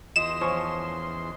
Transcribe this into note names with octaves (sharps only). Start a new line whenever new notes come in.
E2 F4 D#5 C6 D#6 E7
F3 C#4 C#5